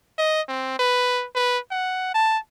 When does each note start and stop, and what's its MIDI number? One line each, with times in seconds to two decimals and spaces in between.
0.18 0.41 75
0.48 0.75 60
0.79 1.26 71
1.35 1.58 71
1.71 2.12 78
2.14 2.38 81